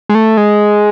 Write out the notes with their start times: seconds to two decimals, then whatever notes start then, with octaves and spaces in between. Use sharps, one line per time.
0.09 G#3
0.15 A3
0.37 G#3